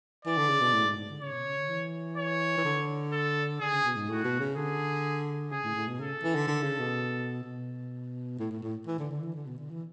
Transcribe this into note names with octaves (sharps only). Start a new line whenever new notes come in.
E3 D5
D3
C#3
B2
A2
G#2
G#2
D3
C#3 C#5
B2
C#3
D3
E3
C#5
E3
D3
A4
D3 G#4
C#3
B2
G#2
A2 F#4
B2
C#3
D3 G#4
C#3 G#4
A2
A2
B2
C#3 A4
E3
D3
D3
C#3
B2
B2
A2
A2
A2
E3
D3
D3
E3
D3
B2
D3
E3